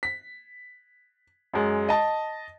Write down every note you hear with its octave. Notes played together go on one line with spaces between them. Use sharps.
B6
F#2 G#3
D#5 A5